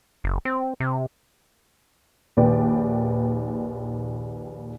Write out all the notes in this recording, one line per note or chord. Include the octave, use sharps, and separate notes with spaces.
F#1
C4
C3
A#1 D#2 D#3 B4 D5 G5